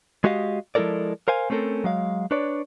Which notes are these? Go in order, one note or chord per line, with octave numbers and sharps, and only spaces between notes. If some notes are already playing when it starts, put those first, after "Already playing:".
G#3 F#4 G4 D#5 F5
F3 G#3 E4 A4 A#4 D5
A#4 C5 F5 G#5
A3 C4 C#4 A4 A#4
F#3 G#3 F5
D4 B4 C#5 D5